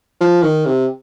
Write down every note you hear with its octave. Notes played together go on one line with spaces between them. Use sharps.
F3
D#3
C3